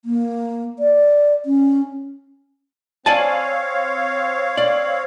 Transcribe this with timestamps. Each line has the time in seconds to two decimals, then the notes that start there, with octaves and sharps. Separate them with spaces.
0.05 A#3
0.79 D5
1.45 C#4
3.06 C4 C#5 D5 F5 G#5 A5
4.57 D5